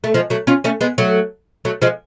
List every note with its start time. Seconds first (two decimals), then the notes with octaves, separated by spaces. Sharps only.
0.04 A3
0.14 F3 G#3
0.30 F#3 A3
0.47 C#4 F4
0.64 A3 C#4
0.81 G#3 B3
0.98 F#3 A3
1.65 F#3 A3
1.82 F3 G#3